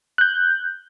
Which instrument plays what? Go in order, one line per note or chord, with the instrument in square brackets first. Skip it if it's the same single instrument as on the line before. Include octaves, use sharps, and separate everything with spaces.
[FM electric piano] F#6 G6